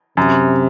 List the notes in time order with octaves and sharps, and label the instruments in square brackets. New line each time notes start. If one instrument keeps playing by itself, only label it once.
[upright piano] F#2 [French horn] C3